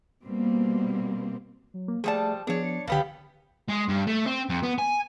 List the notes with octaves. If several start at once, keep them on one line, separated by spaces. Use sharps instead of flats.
B2 G3 A#3 C4
F#3
A#3
F3 G3 A3 G#4 D5 A5
F3 B3 D4 G#4 C#5
C#7
C2 B2 D3 B3 G4 F5
G#3
G2
A3
C4
F2
B3
G#5